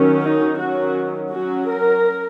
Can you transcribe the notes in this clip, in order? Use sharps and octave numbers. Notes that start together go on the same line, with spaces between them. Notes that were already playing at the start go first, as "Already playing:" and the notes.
Already playing: D#3 F#3 C#4
D#4
D#3 F#3 C#4 F#4
F#3 C#4 F#4
A#4